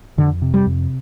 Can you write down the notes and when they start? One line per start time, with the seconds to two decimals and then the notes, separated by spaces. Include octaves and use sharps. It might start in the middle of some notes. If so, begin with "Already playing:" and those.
0.17 F2 D3
0.42 C3
0.54 G3
0.67 F2